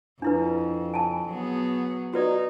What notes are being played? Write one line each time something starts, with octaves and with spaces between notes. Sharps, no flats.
F2 D4 E4 B4
G#5 A5
F#3 B3 G#4
D#4 F#4 B4 D5